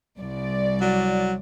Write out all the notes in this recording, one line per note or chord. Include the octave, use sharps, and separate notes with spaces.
C2 D5
F#3